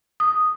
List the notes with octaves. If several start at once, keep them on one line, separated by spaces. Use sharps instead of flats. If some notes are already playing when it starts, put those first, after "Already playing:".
D#6